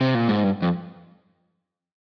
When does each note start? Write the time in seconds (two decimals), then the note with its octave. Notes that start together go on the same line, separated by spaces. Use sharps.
0.01 C3
0.15 A#2
0.28 G#2
0.44 G2
0.62 F2